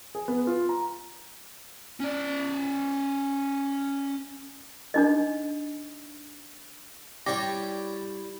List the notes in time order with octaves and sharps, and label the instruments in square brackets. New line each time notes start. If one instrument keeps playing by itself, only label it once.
[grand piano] G#4
B3
F4
A#5
[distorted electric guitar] C#4 D5
[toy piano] D4 D#4 D#5
[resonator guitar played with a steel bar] G3 [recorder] E4 [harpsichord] C#5 D5 G5 [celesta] D6 G6 A#6